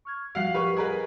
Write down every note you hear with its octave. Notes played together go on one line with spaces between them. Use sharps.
C#6 F6 G#6
F3 G3 F#4 F5 F#5 C7
G4 A#4 B4 C#6
G#4 A#4 B4 D#5